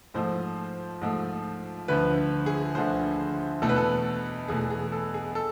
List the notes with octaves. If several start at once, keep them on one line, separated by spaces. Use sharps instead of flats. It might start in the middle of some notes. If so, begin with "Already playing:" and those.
G#2 F3 A3 C5
G#2 F3 A3
D2 D3 F3 B4
G#4
D2 D3 F3 C5
E2 B2 A3 A4
B4
A4
E2 B2 A3 G#4
G#4
A4
G#4
A4